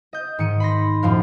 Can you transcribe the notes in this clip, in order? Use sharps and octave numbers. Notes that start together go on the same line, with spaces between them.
D#5 G6
G#2 D#3 C#7 D#7
B5 C6 A#6
F#2 A2 F3 F5